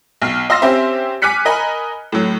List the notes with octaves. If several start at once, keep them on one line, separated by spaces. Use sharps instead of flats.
B1 F6 C7
D#5 F5 C6 E6 A#6
C4 C#4 G4 C5 E5
G#5 D6 F6 F#6 B6 C#7
A#4 D#5 G#5 B5
A2 F#3